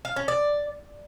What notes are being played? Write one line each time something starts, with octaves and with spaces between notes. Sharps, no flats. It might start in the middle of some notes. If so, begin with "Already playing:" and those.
F5
C#4
D5